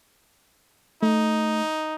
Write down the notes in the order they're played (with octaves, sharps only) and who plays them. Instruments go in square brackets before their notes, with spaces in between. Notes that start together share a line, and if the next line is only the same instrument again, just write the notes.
[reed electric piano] A3 [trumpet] D#4